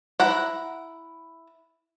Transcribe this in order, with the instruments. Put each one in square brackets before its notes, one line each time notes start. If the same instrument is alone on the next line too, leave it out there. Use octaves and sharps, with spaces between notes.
[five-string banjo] E4 F#5 A#5